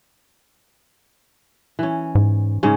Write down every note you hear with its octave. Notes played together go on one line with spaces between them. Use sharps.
E3 C#4
G#2
G#2 C#3 C#4